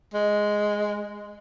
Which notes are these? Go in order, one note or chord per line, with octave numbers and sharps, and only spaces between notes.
G#3